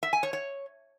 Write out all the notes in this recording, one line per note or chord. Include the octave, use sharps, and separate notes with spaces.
E5
G#5
C#5
C#5